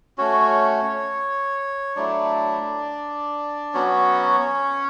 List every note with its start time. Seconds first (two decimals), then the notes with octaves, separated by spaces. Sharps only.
0.18 A3 C#4 F#4 C#5
1.96 F#3 A3 D4 E4 D5
3.74 F#3 B3 C#4 F#4 C#5